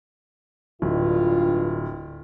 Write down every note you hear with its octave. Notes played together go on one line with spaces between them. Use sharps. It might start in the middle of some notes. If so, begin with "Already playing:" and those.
D1 G2 F4